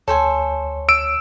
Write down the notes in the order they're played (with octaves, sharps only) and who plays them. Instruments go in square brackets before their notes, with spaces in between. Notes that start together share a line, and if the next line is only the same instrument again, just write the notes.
[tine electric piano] D2 C#5 [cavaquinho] A4 C5 G#5
[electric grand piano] E6 D7